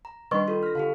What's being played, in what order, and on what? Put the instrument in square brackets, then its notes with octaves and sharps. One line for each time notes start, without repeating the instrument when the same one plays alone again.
[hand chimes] A#5
[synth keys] D#3 G3 D4 [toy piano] B4 D#5 C#6 [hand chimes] C6
[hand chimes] F4 A4
[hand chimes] F6 [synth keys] A#6 B6
[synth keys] D3 [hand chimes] G4 A4 F5